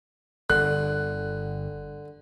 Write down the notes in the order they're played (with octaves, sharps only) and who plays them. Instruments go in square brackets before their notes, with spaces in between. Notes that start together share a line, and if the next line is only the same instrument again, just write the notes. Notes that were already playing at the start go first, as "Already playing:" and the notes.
[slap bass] G1 [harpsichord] D3 [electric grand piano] F#6